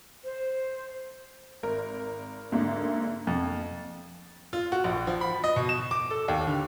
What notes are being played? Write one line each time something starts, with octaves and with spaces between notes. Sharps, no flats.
C5
G#1 A#4
D2 G#2 D3 A#3
F2
F4
F#4
A#1
F3
B5
D#5
B2
E7
D6
A4
D#2
D3